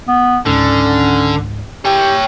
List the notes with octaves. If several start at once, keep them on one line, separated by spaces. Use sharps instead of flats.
B3
C#2 G#2 D3 C#4
G4 C#5 G5